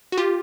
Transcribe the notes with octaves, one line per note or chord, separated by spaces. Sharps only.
F#4
F4 G4